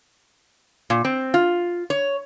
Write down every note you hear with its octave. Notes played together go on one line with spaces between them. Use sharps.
A#2
C4
F4
C#5